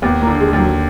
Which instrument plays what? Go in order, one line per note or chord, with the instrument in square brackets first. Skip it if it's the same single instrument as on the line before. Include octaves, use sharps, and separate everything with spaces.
[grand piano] D#2 [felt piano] B3
[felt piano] A#3
[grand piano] D3
[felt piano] G#3
[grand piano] D#2
[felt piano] F#3